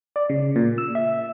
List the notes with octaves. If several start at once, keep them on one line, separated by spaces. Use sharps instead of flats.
D5
C#3
A#2
E6
E5